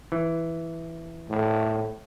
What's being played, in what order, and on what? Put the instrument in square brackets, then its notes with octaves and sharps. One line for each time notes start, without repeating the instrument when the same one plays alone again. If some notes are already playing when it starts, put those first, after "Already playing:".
[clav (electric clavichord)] E3
[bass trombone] A2